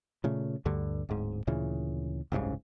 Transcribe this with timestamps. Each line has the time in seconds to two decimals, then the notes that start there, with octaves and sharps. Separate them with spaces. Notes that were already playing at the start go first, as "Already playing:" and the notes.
0.24 A#2 C#3 A3
0.65 D2 G2 D3
1.09 D1 G#2
1.47 D2 A#2 C#3 E3
2.32 F#1 C2 G#2 C#3